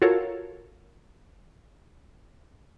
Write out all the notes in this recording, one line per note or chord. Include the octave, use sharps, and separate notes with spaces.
F4 F#4 A4 A#4 C#5